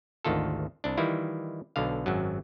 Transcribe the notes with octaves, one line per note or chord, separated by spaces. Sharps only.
G#1 D2 D#3 F4 A4
C2 D4
D#3 E3 G3 E4 F4
B1 B2 D3 F5
G#1 F#2 F#3